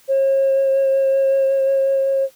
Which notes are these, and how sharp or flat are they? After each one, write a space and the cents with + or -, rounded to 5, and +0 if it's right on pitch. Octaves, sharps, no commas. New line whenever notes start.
C#5 -45